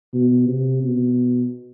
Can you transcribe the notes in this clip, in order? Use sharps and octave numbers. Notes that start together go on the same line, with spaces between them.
B2
C3
B2